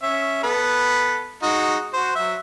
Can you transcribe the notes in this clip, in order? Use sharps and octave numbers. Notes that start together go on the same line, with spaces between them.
C#4 E5
B3 A4 B4
G#3 D#4 F#4
F#4 C5
F#3 E5